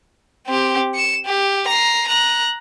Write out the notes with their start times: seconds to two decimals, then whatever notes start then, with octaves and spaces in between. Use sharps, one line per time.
0.47 C4 G4
0.95 C#7 E7
1.25 G4
1.68 A#5 C7
2.08 A#5 F#6